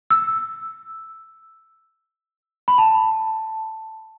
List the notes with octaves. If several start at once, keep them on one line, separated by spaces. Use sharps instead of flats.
E6
B5
A5